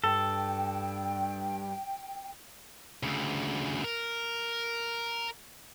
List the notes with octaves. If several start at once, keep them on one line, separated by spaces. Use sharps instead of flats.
G2 A4 G5
D2 C#3
A#4